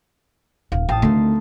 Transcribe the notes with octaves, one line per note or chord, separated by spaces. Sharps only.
D#1 F5
A1 F5 G5 A5 D#6
D2 D#3 A3 C4 D#4 C6